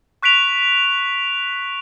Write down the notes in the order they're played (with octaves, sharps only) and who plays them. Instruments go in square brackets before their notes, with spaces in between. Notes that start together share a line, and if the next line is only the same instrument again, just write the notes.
[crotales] C#6 F#6 B6 D7 F7